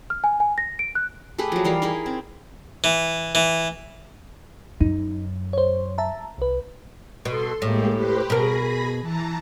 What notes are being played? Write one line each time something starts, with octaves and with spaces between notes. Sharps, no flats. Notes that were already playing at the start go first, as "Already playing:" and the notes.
F6
G#5
G#5
A#6
D7
F#6
A3 G4 G#4 B4
F3 F#3
E3 G3 A#4 F5
D#4 E4 G#4 A#4
C4
E3
E3
F#2 D#4
C5 C#5
E5 A5 A#5
C2 B4
B2 A4 C6
A2 G#3 A#3 G4
G4 B4 C5
B2 G#4 A#4 B5 A#6
E3 A5 A#5